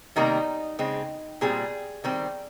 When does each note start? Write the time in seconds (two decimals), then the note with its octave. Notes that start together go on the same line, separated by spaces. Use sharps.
0.16 C3 D#3 G3 A#3 D#4
0.79 C#3 G#3 C4
1.41 A#2 G3 C4 G#4
2.04 D#3 G3 C4